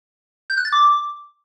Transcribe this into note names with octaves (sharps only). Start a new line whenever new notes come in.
G6
F#6
A6
D6